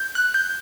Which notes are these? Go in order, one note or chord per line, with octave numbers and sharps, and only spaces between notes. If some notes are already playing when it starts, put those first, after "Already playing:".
Already playing: G6
F#6
G6